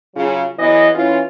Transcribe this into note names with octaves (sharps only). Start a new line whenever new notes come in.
C#3 F#3 F4
E2 E3 F#3 B3 D#5
E3 C#4 F4